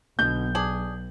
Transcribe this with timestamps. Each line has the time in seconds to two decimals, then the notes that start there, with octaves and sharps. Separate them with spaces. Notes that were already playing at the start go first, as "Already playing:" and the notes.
0.19 B1 B2 D3 G6
0.55 D4 G#4 F#7